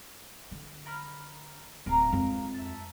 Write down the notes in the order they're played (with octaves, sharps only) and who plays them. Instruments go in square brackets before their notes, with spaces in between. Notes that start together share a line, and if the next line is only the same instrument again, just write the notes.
[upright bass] D3
[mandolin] A#4 B5 F6
[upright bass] D1 [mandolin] A#4 F5 A#5
[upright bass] F2 G#3
[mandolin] E5 A5